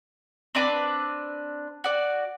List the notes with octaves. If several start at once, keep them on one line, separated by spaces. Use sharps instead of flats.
C4 D4 B4 D6
F#4 D5